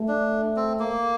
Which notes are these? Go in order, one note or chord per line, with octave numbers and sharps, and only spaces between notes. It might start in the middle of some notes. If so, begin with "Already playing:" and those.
Already playing: A3
D4
C4
A#3